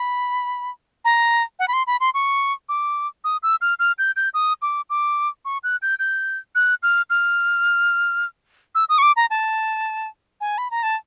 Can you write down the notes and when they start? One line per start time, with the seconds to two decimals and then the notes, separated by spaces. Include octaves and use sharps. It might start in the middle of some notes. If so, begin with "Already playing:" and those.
Already playing: B5
1.05 A#5
1.59 F#5
1.68 B5
1.73 C6
1.87 B5
2.00 C6
2.14 C#6
2.69 D6
3.24 D#6
3.43 E6
3.61 F6
3.79 F6
3.98 G6
4.16 G6
4.34 D#6
4.62 D6
4.90 D6
5.45 C#6
5.63 F#6
5.82 G6
5.99 G6
6.55 F#6
6.83 F6
7.10 F6
8.75 E6
8.89 D#6
8.98 C#6
9.02 D6
9.16 A#5
9.30 A5
10.41 G#5
10.58 B5
10.71 A#5
10.83 A5